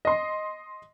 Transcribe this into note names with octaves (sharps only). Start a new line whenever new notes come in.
D#5 C6